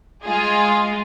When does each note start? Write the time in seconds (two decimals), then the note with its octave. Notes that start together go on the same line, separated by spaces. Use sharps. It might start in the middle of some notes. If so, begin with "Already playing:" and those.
0.24 G#3 F4 G#4